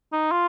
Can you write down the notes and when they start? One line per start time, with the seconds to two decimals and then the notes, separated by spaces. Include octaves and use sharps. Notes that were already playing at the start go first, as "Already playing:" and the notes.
0.13 D#4
0.32 F4